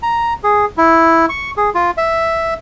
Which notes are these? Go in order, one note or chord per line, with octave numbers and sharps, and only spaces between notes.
A#5
G#4
E4
C#6
G#4
F4
E5